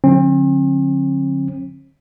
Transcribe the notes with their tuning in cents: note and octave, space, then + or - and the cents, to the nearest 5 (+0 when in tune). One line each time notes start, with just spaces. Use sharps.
D3 +0 F#3 -40 C4 +45